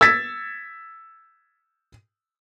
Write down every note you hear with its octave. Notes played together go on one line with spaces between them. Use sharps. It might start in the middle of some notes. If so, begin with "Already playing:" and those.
E6 G#6 A6 B6